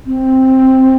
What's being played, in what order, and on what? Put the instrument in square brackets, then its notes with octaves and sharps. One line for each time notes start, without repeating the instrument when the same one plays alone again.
[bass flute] C4